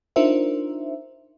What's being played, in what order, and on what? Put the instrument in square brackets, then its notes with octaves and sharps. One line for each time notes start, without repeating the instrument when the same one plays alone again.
[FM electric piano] D4 D#4 F4 A#4 C5 E5